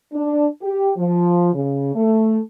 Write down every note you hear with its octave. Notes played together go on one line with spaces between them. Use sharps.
D4
G4
F3
C#3
A3